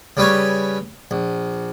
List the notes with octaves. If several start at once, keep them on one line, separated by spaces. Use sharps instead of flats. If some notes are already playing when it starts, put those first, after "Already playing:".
C#3 G3 B4 C#5
A#1